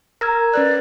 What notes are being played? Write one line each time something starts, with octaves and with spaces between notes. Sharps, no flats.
A#4 A#5 E6 G#6
C#4 B4 D5 F#6